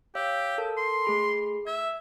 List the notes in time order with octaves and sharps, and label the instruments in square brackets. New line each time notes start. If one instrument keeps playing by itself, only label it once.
[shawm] G4 [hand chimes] C#5 F5 E6
[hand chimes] A4 A#4 A5
[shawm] C6
[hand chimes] A3 G#4 B5
[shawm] E5 [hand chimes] G#6